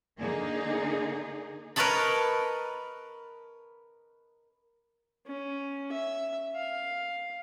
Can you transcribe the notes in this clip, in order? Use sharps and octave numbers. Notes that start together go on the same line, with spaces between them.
D3 A#3 D#4 G#4
A#4 B4 C#5 D#5 A5 B5
C#4
E5
F5